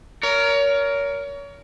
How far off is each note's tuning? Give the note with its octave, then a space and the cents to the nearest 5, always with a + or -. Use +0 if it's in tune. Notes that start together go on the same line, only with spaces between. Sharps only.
A#4 +0 C#5 +35